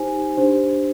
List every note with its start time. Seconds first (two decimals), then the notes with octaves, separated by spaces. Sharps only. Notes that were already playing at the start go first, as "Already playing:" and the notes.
Already playing: D#4 G4 C5 G#5
0.37 D4 G4 C5